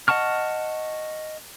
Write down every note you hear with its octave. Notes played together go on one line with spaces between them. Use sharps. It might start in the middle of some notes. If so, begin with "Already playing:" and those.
D#5 F#5 A5 C#6 F6